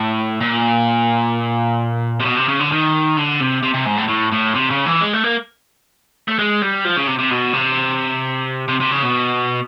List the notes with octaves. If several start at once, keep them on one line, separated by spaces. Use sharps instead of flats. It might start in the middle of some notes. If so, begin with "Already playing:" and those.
Already playing: A2
A#2
C3
B2
C3
C#3
D3
D#3
D3
C3
C3
C3
G#2
A2
A2
A2
C3
C#3
E3
G#3
A3
A#3
A3
G#3
G3
F3
C#3
C3
C3
B2
C3
C3
C3
C#3
B2